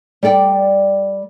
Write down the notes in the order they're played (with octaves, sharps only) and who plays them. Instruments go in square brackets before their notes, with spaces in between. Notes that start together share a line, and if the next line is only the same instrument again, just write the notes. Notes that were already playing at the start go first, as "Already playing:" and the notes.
[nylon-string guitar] G3 A4 D5 G5